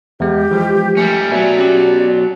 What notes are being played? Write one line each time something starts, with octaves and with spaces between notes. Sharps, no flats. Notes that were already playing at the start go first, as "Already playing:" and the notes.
E2 G#3 G4
E3 F3 G#3
G3 A3 C#4 G4 C#7
B2 F#3 B4 D5 E5 G#5
B3 C#4 G4